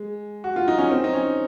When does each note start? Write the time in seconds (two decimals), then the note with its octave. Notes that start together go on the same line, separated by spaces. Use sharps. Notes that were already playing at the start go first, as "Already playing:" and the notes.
Already playing: G#3
0.44 F#4
0.56 F4
0.68 D#4
0.78 C#4
0.91 C4
1.04 D#4
1.13 C#4